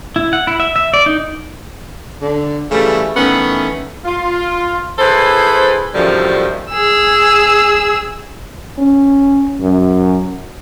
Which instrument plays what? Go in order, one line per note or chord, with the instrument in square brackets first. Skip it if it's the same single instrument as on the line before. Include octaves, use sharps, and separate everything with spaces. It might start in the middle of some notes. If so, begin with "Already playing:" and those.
[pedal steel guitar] E4
F#5
E4
E5
E5
D5
D#4
[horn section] D3
C#3 E3 G3 A3
D#3 E3 A3 B3 C#4
[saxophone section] F4
E4 G#4 A4 B4 C5
F#2 A2 D3 D#3 F3 G3
[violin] G#4 E6
[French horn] C#4
F#2